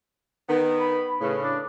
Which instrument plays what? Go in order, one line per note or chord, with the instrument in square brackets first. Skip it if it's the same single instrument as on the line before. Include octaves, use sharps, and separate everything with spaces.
[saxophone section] D#3 B3
[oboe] B5
[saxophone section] A2 C#3 [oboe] B4
[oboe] D4